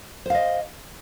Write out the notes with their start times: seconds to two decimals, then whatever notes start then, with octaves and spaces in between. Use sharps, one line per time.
0.26 C5
0.30 F5
0.34 D#5